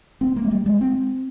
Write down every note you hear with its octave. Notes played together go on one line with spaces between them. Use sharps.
C4
A#3
G#3
G3
G#3
C4